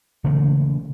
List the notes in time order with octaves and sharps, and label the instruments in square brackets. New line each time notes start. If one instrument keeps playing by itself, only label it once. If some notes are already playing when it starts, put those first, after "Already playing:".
[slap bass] C#3 E3 A3 A#3